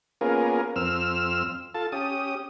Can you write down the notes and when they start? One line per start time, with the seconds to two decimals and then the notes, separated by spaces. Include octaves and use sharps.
0.21 A#3 B3 C#4 F4 G#4 A#4
0.76 F2 C4 E6 F6
1.75 F4 A4 A5
1.92 C#4 G4 D#6